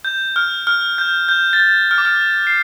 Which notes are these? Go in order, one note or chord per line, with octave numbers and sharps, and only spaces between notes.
G6
F6
F6
G6
G6
A6
G6
F6
D6
F6
C7